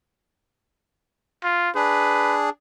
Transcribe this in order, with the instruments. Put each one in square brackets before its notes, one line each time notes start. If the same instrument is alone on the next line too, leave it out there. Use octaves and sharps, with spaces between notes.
[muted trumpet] F4
[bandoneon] D4 G#4 [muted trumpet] B4